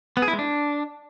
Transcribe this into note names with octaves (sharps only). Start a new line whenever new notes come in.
B3
G#4
E4
G#3
D4